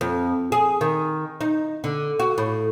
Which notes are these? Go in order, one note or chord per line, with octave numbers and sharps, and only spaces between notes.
F2
G#4
D#3
D#4
D3
F#4
A2